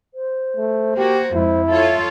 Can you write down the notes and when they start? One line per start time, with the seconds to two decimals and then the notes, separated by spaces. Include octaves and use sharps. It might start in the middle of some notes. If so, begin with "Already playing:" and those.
0.14 C5
0.56 A3
0.97 A#3 F#4 G4
1.34 F2 G#2 E4
1.68 F4 A4 C#5 E5